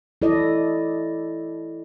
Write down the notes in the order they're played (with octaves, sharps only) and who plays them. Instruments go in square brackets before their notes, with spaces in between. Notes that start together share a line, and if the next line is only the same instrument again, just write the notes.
[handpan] E4 A4 D5 D#5